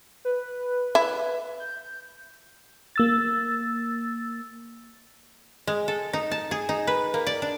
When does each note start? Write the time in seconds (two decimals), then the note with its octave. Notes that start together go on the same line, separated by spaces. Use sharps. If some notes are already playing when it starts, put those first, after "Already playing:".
0.25 B4
0.95 E4
1.60 G6
2.96 A#3 E6 A6
5.67 G#3
5.88 A4
6.13 D#4
6.31 A5
6.51 G#4
6.69 D#4
6.87 B4
7.14 A#3
7.27 D5
7.42 D4